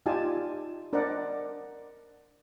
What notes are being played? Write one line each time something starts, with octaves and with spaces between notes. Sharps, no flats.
D#4 F4 G4 D5 G#5 A5
D4 A#4 C5 D5 D#5 F#5